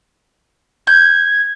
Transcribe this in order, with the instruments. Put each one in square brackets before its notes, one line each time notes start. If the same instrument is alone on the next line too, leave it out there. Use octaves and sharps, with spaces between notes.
[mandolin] G6 [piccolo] G#6